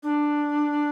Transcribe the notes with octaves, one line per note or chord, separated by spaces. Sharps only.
D4